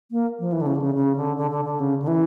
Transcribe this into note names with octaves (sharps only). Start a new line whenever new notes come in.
A#3
F3
E3
D3
C#3
D3
C#3
C#3
D3
D3
D3
D3
C#3
D3
E3